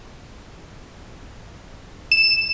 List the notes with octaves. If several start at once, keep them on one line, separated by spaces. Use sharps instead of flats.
E7